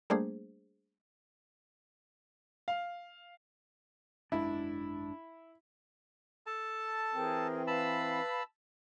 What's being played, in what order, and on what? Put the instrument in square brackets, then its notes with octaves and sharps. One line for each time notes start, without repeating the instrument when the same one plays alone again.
[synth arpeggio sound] G3 A3 A#3 D4 G#4 C5
[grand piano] F5
[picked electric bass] G#1 F#2 G#3 [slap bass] D4 [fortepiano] E4
[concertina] A4 A5
[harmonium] E3 C4 [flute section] G#4 A#4 G5
[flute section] B4 F5 [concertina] A5 B5 E6